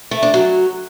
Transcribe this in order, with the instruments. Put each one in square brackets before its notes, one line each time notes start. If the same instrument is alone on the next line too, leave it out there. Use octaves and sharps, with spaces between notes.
[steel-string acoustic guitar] A3
D4
F#3